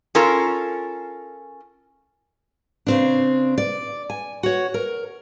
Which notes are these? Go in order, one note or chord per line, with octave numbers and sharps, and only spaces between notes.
C#4 F4 A4 A#4
C#3 C4 D4
D5
G#5
F#4 C#5
A#4